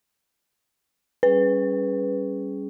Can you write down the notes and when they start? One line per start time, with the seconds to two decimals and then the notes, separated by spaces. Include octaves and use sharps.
1.23 G3 C#4 G#4 B4